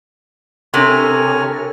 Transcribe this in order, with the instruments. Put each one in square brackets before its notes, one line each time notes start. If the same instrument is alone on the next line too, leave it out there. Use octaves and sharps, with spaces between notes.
[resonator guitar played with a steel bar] C3 [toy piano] D4 C6 [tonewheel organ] A4 A#4 [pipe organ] C#5 G#5 F6